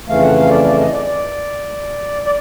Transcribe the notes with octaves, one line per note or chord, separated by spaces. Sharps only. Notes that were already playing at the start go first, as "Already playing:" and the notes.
F2 C#3 E3 A3 F5
F#5
F5
D5
D5
D#5
D5
D5
D5